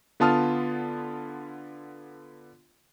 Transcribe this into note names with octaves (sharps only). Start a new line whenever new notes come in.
D3 B3 F4 A5 D#6 F6